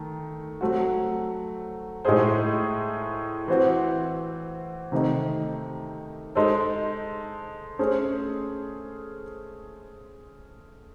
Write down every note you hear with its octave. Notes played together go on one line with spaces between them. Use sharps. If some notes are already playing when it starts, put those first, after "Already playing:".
Already playing: D#3 A3
F#3 A3 C4 F#4
A2 G#3 D#4 G#4 C5
E3 C4 F#4 C5
C3 D#3 A3 D#4
G#3 D#4 A4 C5
A3 C#4 G#4 C5